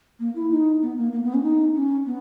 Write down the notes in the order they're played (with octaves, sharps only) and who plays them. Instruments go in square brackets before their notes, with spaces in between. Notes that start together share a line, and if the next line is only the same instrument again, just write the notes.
[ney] A#3
E4
D#4
B3
A#3
A#3
B3
C#4
D#4
C#4
B3